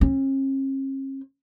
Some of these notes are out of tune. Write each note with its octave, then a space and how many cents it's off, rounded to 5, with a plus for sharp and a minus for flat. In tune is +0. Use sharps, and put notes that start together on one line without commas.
C#4 -45